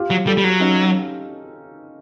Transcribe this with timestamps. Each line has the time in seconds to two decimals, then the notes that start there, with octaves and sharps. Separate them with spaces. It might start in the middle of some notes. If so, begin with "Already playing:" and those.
Already playing: F4 G4
0.10 F#3
0.26 G3 G4 A4
0.37 G3
0.44 F#3
0.60 C#4 D#4